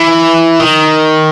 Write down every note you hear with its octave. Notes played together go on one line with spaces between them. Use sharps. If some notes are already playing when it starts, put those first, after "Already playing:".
Already playing: E3
D#3